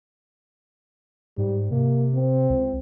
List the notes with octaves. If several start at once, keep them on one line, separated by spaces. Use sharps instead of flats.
G#2 G3
C3 A#3
C4
C#2